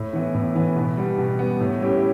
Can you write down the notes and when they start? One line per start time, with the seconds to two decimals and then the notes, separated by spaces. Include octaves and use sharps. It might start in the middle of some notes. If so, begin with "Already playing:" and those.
Already playing: A2
0.13 E3 B3 E4
0.34 A2
0.55 E3 B3 E4
0.76 B2
0.97 G3 B3
1.18 B2
1.39 G3 B3
1.60 A2
1.81 G3 C#4 E4 G4